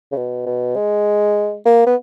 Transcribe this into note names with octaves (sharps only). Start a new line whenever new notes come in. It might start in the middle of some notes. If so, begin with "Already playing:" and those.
C#3
B2
B2
G#3
A#3
B3